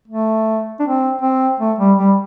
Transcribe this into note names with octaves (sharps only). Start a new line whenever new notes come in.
A3
D4
C4
C4
A3
G3
G3